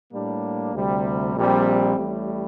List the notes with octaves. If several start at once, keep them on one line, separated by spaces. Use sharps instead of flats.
A2 G3 A#3 D4
D2 C3 G3
A#1 A#2 G3 C4
A1 A2 G3